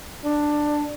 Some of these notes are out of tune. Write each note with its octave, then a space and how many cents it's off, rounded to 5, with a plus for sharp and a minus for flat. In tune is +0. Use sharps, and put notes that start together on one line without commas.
D4 +10